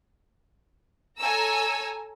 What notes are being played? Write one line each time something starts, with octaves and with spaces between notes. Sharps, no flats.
A4 C#5 G#5 A#5 E6